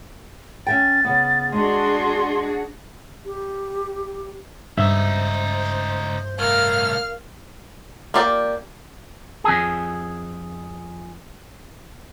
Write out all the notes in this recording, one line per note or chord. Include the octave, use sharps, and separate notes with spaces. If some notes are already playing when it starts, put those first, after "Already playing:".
C#4 E5 G5 A6
C#3 B3
G#3 D4 F#4 G#4 C6
G4
C#2 G2 D#4 C5 E5
C2 A2 A#4 F5 F6
A#3 F4 G4 D5 G5
F2 G#4